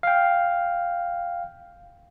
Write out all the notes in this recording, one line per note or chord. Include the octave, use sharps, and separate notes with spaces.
F5 G5